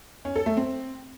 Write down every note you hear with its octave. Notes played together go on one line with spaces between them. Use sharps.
C#4
A4
A3
C4